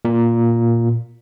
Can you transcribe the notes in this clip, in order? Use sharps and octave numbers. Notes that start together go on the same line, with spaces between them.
A#2